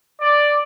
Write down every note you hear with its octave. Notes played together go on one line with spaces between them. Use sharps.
D5